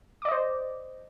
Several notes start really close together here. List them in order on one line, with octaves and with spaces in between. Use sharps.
D6 D5 D#5 C5